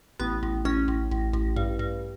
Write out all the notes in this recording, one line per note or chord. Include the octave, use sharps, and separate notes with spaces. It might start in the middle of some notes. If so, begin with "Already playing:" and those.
A1 B3
A1
A1 C#4
A1
A1
A1
G2
G2